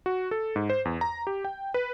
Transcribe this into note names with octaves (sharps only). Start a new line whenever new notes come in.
F#4
A4
G#2
C5
E2
A#5
G4
G5
B4